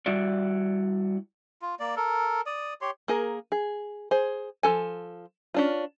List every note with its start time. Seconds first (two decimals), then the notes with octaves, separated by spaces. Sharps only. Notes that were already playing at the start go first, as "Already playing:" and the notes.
0.06 G3 E4 F#4 D5
1.62 F4
1.80 A#3 D5
1.96 A4 A#4
2.46 D5 D#6
2.81 G4 C#5 C6
3.08 A#3 G#4 A#4
3.52 G#4
4.11 G#4 C5
4.63 F3 A4 G#5
5.54 C#4 D4 F4